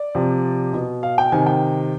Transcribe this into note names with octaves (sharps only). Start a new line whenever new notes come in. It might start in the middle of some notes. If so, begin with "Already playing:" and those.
Already playing: D5
C3 F3
B2
F5
G5
C3 D#3 G#5
G5